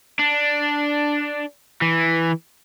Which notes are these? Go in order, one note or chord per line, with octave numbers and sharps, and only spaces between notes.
D4
E3